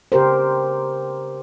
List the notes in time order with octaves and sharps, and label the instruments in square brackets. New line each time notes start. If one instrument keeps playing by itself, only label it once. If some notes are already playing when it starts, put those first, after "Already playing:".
[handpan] C#3 G4 A#4 C5